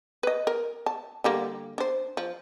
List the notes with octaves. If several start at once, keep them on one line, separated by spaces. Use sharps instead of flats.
B4 D#5
A#4
A5
D3 G3 A#3
D4 C5
F3